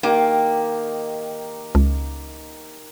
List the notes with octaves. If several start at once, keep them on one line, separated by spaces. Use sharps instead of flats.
D#3 A#3 G4 A#4
C#2